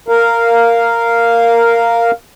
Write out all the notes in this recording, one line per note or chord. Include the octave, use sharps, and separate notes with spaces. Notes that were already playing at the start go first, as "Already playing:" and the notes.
A#4 F5